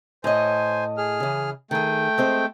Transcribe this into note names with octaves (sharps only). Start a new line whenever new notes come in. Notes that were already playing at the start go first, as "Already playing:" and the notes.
A2 C5 C#5 D#5 G#5
G#4 F6
C#3 E3
D#3 A3 G#4 G5
G#3 C4 C5